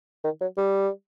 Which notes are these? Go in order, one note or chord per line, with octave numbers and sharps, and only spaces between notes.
D#3
F#3
G3